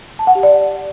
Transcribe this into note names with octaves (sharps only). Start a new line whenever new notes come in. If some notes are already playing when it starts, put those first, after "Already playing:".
A5
F#5
G4
D5